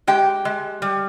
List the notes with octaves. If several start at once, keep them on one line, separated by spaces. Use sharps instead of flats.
G#3 G4 G5
G#3
G3